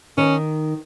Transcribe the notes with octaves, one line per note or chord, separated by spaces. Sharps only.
D#3 C#4